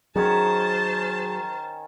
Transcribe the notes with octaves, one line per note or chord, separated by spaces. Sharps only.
D#3 F#3 C#4 G#4 C5 C#5 A5